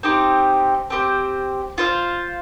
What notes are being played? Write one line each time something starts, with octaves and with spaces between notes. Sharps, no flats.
C4 D#4 G4 C5
C4 G4 C5
F4 C5 F5